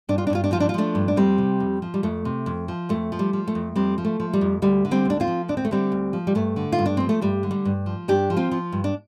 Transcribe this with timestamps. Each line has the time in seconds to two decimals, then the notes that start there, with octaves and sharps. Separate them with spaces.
0.09 G2 D4
0.18 F4
0.27 D4
0.30 G2 F4
0.44 D4
0.52 F3 F4
0.60 D4
0.69 F4
0.74 F3 A3 D4
0.95 G2
1.08 D4
1.16 F2 G3 C4
1.38 C3
1.60 F2
1.82 F3
1.94 G3
2.03 F2 A3
2.25 C3
2.46 F2
2.68 F3
2.89 F2 A3
3.12 F3
3.19 G3
3.33 F3
3.48 A3
3.55 F2
3.76 F2 G3 C4
3.98 F3
4.05 A3
4.20 F3
4.33 G3
4.41 F2
4.62 D2 G3
4.85 D3
4.91 G3 C4
5.05 D2 D4
5.20 C4 F4
5.28 F3
5.48 D2 D4
5.57 C4
5.65 A3
5.71 D3 G3 C4
5.92 D2
6.13 F3
6.27 G3
6.35 G2 A3
6.56 D3
6.72 F4
6.78 G2
6.86 D4
6.97 F3 C4
7.09 A3
7.21 G2 G3
7.43 D3
7.51 G3
7.65 G2
7.86 F3
8.08 G2 D4 G4
8.30 F3
8.37 C4 F4
8.51 F3
8.72 G2
8.84 D4